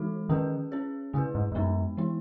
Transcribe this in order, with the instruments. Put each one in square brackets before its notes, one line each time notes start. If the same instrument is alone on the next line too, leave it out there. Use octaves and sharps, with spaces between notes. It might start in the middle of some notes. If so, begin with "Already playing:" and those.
Already playing: [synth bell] E3 G#3 D#4 F#4 A4
[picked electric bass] D#3 [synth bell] C#4 G#4 B4
[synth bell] C#4 G#4 C#5
[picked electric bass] C#3 [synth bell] A3 E4 G#4 B4
[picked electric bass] G#2
G#2
[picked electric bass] F#2 [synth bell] G#3 B3 D#4
[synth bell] E3 G#3 B3 E4